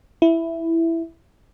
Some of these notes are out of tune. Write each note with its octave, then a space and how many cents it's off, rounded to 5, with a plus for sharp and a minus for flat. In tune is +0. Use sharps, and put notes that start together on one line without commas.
E4 +5